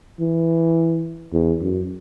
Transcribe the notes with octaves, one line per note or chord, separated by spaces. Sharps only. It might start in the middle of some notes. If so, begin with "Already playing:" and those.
E3
E2
F#2